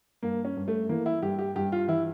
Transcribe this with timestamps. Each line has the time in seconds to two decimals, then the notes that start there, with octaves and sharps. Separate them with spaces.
0.23 G2 A#3
0.45 C#4
0.56 G2
0.68 A3
0.89 E3 A#3
1.06 E4
1.22 G2 G4
1.39 G4
1.56 G2 G4
1.72 F4
1.88 E3 E4